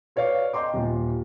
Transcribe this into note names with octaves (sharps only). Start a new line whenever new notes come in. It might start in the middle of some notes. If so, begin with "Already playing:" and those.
B4 C#5 D5 F5
D#5 G5 A#5 C6 D6
D#1 F4